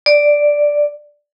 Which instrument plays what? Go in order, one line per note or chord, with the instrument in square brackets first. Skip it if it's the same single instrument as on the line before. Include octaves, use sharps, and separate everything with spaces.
[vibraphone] D5